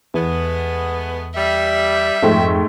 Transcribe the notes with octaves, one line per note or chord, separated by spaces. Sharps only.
E2 G#3 A3 B3
G3 E5
F2 G#2 A3 G5